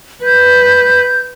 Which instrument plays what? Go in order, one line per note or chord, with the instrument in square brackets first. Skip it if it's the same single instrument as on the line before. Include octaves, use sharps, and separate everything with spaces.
[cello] B4 [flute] G6